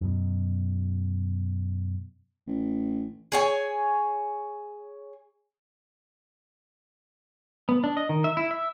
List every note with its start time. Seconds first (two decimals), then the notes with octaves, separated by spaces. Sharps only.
0.01 F#2 B2
2.47 A1
3.32 G#4 C#5 G#5
7.69 B3
7.84 D4
7.97 D#5
8.09 D#3
8.24 E5
8.37 E4
8.51 E5